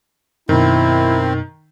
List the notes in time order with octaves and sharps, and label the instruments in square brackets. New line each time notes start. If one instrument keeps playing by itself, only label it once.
[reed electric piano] F#2 B2 [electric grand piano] D#3 [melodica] C4 [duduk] E4